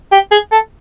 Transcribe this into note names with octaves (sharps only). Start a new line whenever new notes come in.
G4
G#4
A4